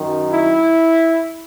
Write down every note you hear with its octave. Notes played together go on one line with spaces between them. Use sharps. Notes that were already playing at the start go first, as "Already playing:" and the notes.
Already playing: F#2 D#3
E4